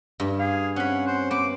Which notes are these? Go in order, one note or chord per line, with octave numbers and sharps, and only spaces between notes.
G2
G#4 F5
C4 C#4 F#5 B5
C4 C5
B3 D6